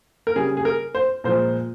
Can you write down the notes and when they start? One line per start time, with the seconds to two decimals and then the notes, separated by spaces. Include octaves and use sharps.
0.27 A#4
0.36 C#3 G3 G#4
0.57 G#4
0.65 A#4
0.95 C5
1.24 A#2 F3 G#3 C5